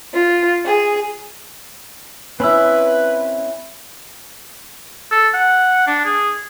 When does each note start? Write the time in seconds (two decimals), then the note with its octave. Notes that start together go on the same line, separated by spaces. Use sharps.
0.14 F4
0.64 G#4
2.40 C4 C#4 E4 B4 B5 E6
5.11 A4
5.34 F#5
5.87 D4
6.05 G#4